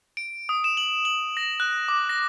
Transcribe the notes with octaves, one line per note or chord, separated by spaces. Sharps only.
D7
D#6
E7
F#7
F#7
A#6
F#6
D6
A#6